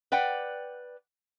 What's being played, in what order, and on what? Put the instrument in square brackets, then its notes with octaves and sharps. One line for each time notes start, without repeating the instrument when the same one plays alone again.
[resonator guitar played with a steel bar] B4 D5 F#5 G5